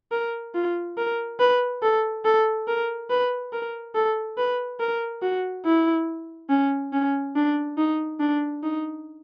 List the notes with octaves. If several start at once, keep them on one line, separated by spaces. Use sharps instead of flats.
A#4
F4
A#4
B4
A4
A4
A#4
B4
A#4
A4
B4
A#4
F#4
E4
C#4
C#4
D4
D#4
D4
D#4